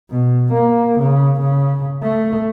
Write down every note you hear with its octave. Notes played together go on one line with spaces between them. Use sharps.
B2
A#3
C#3
C#3
A3